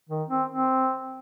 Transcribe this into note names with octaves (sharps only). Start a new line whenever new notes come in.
D#3
C4
C4